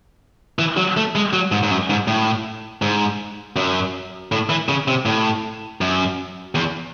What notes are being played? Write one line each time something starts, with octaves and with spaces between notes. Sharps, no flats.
E3
F#3
A3
G#3
F#3
G#2
G#2
F#2
G#2
A2
G#2
F#2
A2
E3
C#3
C3
A2
F#2
E2